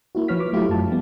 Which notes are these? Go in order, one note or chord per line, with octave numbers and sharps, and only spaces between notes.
A#3 E4 F#4
F3 B4 C#5 F6 B6
D6
F#3 A3 E4 F4 G4
F#2 A5
F3 G3 B3